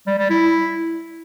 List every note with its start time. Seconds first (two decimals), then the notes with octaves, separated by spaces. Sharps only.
0.07 G3
0.19 G3
0.30 E4